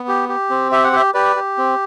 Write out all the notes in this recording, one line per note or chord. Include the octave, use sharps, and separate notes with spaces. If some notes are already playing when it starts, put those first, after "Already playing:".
Already playing: B3
G4
G4
C4
G4 E5
F#5
G4 C5 E5
G4 B4 D5
G4
C4